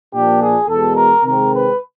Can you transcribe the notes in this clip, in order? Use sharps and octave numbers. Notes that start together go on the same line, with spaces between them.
A#2 F3 A#3 D4 G4
G#4
E2 B2 G#3 A4
A#4
C3 D#3 G#3 C4 A#4
B4